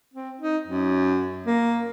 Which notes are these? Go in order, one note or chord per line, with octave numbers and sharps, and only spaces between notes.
C4
D#4
F#2
A#3